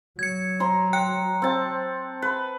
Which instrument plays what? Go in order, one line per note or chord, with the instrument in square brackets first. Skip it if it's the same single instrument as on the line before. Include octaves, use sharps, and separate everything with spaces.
[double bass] F#3 [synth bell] G#6 C#7
[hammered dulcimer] A#5 C6
[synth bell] G5 F#6 C#7
[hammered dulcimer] C4 A5
B4